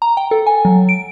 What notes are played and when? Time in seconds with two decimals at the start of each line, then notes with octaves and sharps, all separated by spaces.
0.02 A#5
0.17 G5
0.31 A4
0.46 G#5
0.65 F#3
0.89 D7